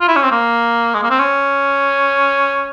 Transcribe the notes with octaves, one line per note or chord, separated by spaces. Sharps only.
F4
E4
C#4
C4
A#3
G#3
A#3
C4
C#4